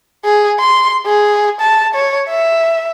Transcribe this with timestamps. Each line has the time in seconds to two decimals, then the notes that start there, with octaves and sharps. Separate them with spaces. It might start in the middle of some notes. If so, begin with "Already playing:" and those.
0.25 G#4
0.59 C6
1.06 G#4
1.61 A5
1.95 C#5
2.29 E5